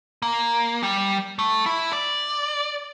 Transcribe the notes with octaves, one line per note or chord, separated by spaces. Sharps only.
A#3
G3
A3
E4
D5